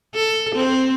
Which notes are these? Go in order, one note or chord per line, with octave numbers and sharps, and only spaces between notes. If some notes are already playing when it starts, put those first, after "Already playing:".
A4
C4